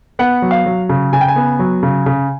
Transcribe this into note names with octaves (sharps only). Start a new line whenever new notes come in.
B3 F#5
F#3
F5
F#3
C#3
C#3 G#5
G5
G#5
B3
F#3
C#3
C#3